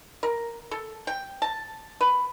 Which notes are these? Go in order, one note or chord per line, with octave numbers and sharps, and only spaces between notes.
A#4
A4
G5
A5
B4